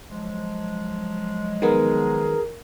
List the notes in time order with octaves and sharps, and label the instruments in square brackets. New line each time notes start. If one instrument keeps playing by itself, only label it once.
[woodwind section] F3 F#3 G#3
[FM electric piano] D#3 B3 [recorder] G#4 [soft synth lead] A#4